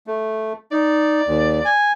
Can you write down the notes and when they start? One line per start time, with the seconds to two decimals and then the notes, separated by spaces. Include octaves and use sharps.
0.07 A3
0.72 D#4 D5
1.27 D#2
1.65 G#5